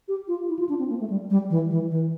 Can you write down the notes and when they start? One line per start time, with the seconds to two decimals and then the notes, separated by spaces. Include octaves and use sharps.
0.08 G4
0.28 F4
0.49 E4
0.59 F4
0.69 D4
0.79 C4
0.89 A#3
1.00 A3
1.10 G3
1.30 G3
1.50 E3
1.70 E3
1.91 E3